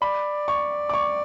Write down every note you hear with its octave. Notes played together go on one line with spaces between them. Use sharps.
D5 B5
C#6
D6
C#6